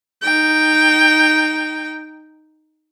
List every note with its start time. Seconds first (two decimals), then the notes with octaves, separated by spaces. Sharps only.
0.22 D#4 G5